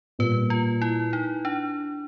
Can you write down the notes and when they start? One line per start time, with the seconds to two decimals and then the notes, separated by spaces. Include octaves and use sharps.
0.19 A#2 G3 A#3 B4
0.50 F4
0.82 E4
1.13 D#4
1.45 D4